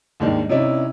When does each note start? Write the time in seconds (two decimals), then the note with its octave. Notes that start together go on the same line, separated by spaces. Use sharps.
0.20 D#2 G#2 D#3 D4
0.49 C3 C#4 D#4 E4 D5